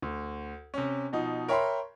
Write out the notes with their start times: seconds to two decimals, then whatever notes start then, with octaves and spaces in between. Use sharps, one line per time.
0.02 D2
0.74 C3 C#4
1.13 B2 F3 D#4
1.48 A#4 C#5 E5 G5 B5 C6